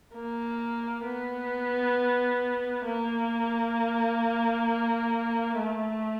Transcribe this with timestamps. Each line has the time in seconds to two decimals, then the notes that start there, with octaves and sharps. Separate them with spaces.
0.14 A#3
1.05 B3
2.86 A#3
5.58 A3